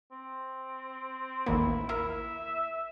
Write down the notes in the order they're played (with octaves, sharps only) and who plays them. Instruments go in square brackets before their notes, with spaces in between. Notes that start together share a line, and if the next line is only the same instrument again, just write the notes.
[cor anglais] C4
[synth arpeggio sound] A1 D#2 A#3 [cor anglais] E4
[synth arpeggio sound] E4 A#4 [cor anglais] E5